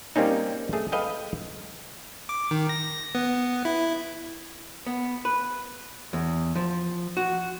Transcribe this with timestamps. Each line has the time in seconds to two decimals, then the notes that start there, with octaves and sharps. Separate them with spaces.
0.16 G3 A#3 C4 C#4 D#4
0.73 A3 G#4
0.92 A4 B4 D#5 F5 G5
2.29 D6
2.51 D#3
2.69 A#6
3.15 B3
3.65 E4
4.87 B3
5.25 B4
6.13 E2
6.55 F3
7.17 F#4